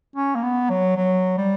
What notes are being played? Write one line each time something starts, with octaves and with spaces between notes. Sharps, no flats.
C#4
A#3
B3
F#3
F#3
G3